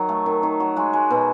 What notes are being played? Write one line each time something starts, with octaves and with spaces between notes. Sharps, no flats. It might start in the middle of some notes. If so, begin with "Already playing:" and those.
Already playing: D#3 F#3
A3
D#3
D#3
F#3
G#3 F#4
G#3
B2